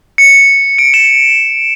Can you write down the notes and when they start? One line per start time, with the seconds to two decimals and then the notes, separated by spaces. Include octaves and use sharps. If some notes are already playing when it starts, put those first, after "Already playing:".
0.18 C#7
0.79 D7
0.94 E7